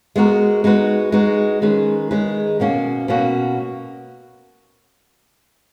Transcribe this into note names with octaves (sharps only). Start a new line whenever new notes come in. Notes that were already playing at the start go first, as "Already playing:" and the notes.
G#3 B3 F#4 A#4
G#3 D#4 F#4 B4
G#3 D#4 F#4 B4
D#3 G#3 C#4 G#4 B4
D#3 G#3 C#4 G#4 B4
B2 A#3 C#4 F#4
B2 A#3 C#4 F#4